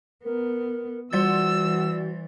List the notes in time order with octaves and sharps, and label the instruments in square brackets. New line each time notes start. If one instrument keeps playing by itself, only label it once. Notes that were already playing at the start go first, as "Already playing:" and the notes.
[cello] B3 [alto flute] A#4
[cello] E3 [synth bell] G3 D5 A6 [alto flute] F#4 [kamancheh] E6